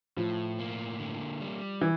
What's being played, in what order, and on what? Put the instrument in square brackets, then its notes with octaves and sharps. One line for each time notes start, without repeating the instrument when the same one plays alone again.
[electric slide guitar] A2 [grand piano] F3
[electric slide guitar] A#3
D3
G3
[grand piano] E3